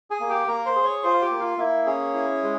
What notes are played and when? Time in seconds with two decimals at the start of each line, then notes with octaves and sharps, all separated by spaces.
0.10 G#4 G#5
0.20 A#3
0.29 G4 G5
0.47 A#3 A#4 A#5
0.66 C5 C6
0.75 G#4
0.84 C#5 C#6
1.03 F4 C5 C6
1.13 F5
1.21 G4 G5
1.31 A#3
1.40 F4 F5
1.58 A#3 E4 E5
1.86 C#4 G#4 C#5
2.14 E4
2.43 G#3